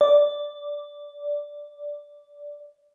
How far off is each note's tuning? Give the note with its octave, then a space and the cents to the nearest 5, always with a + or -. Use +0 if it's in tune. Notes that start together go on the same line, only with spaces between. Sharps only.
D5 -5